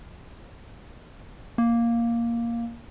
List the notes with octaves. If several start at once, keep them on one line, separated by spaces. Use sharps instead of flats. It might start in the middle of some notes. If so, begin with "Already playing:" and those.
A#3